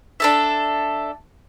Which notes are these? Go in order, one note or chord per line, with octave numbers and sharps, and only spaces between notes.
D4 A4 E5